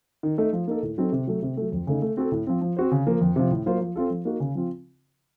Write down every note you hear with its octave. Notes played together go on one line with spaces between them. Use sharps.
D#3
A3 D#4
F3
A#3 D#4 A4
A2
F#3 C4 D#4 A4
C3
F#3 A3
C3
F#3 A3
F2
C#3 A3 D#4
A3
C4 F#4 A4
A2
F3 C4
F3
C4 F#4 C5
C#3
F3 A#3
F2
C3 F3
A2
F#3 A#3 F4 C5
F3
C4 F4 A4
F3
A#3 D#4 F#4
C#3
F3 C4 F4